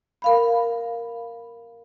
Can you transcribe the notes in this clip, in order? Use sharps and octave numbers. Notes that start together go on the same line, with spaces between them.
A#4 F5 B5